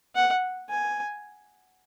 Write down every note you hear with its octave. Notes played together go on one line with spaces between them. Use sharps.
F#5
G#5